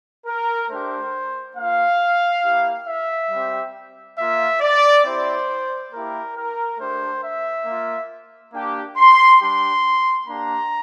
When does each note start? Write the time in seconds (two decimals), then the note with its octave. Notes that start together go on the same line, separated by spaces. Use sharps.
0.26 A#4
0.69 A3 D4 G4 C5
1.56 A#3 F4 F5
2.44 A#3 E4 G4
2.87 E5
3.31 G3 C4 G4
4.17 A#3 F4 E5
4.61 D5
5.05 C4 E4 G4 C5
5.92 A#3 E4 G4 A#4
6.36 A#4
6.79 A3 D4 G4 C5
7.23 E5
7.66 A#3 F4
8.53 A#3 D4 G4
8.97 C6
9.40 G3 D4 G4 C6
10.27 A#3 D4 G4 A#5